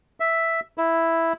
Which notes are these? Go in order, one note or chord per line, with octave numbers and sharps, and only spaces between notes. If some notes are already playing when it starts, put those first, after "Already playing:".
E5
E4